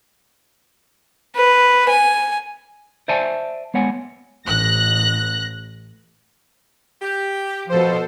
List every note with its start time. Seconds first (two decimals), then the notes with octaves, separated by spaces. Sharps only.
1.37 B4
1.90 G#5
3.08 C5 D5 E5 G#5 A5
3.74 G#3 B3 C#5 F#5 G#5
4.46 A1 F#6 A#6
7.01 G4
7.69 B2 F3 A4 C5